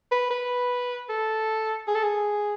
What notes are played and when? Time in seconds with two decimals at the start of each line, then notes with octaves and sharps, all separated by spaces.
0.11 B4
0.31 B4
1.09 A4
1.87 G#4
1.95 A4
2.03 G#4